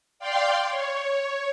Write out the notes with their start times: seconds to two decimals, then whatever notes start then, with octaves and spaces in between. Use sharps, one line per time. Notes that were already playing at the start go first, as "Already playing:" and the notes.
0.19 D5 F5 G5 C6
0.68 C#5